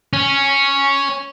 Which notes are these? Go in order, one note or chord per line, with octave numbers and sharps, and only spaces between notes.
C#4